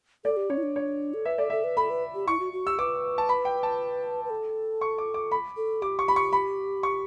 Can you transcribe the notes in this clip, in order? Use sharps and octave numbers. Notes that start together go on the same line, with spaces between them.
A4 D5
G4
C#4 C#5
E4
D4
C#5
A4
B4 E5
A4 D5
A4 E5
B4
A4 B5
B4
G4
E4 C#6
F#4
F#4
G4 E6
B4 D6
A5
B5
G5
A5
B4
A4
C#6
D6
D6
B5
A4
G4 D6
C#6
B5
C#6
B5
C#6